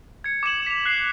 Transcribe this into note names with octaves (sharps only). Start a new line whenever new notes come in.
G#6 C#7
D6 G#6 E7 F#7
B6 F7
F#6 C7